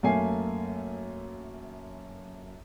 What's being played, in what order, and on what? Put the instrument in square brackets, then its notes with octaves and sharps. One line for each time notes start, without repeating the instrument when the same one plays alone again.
[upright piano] F#2 A3 A#3 G#5 C7